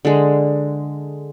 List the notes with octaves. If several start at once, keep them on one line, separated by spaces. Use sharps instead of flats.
D3 G#3